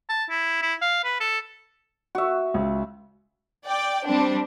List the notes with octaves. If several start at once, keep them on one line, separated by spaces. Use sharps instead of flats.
A5
E4
E4
F5
B4
A4
F#4 E5
C#2
D5 G5
G3 C4 D4